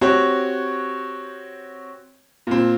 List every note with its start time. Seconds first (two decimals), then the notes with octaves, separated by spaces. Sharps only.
0.01 C4 F#4 G4 C#5
2.47 A#2 C4